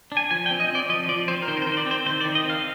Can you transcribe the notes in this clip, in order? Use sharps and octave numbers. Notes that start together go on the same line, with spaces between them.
D4
G#5
F3 G#5
G5
C4
D#5
C4
D5
F3 D#5
F3 D5
C4 C5
A#4
D#3 C5
A#4
C5
D#3
C5
D5
C4 C5
D#3 C5
D5
D#3
D#5
C4
F5